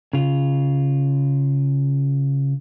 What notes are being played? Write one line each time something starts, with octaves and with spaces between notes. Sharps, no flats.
C#3 F4